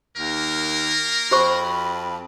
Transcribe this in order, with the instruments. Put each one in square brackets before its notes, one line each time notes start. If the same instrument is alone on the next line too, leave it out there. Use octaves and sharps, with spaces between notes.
[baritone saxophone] D#2 [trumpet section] A#3 A#4
[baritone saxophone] F2 [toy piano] F#4 C5 C#6 [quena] B5